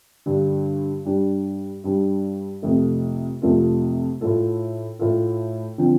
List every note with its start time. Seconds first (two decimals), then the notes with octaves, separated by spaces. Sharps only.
0.26 G2 D3 G3
1.05 G2 G3 D4
1.84 G2 G3 D4
2.62 F2 C3 A3 F4 A4
3.42 F2 C3 A3 F4 A4
4.21 A2 A3 F4 A4
4.99 A2 A3 F4 A4
5.78 D3 F3 C4